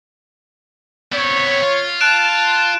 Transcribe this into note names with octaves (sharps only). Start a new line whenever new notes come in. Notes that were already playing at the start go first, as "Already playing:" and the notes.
B3 C4 C#5
F4
A5 F#6 D7 E7